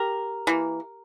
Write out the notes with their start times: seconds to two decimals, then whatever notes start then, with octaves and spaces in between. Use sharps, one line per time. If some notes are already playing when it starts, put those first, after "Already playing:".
Already playing: G4 A#4
0.47 E3 A#3